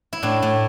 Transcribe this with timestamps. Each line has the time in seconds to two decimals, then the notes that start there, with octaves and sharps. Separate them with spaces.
0.13 E4
0.23 A2 D4
0.42 A2